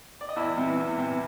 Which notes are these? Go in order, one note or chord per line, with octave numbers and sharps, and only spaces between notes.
D5
D#5
E2 E4 E5
C3 E3
E2
C3 E3